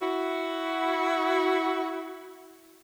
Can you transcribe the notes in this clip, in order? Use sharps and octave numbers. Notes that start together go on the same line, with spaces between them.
E4 F#4